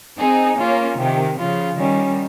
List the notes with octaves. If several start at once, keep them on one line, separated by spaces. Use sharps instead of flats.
C4 D#4 G#4
A#3 C#4 F4
C3 D#3 G4
C#3 F3 F4
D#3 G3 C#4